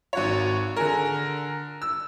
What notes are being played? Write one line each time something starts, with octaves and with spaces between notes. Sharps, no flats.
G#1 F#4 C#5
D3 G#4 A#4
E6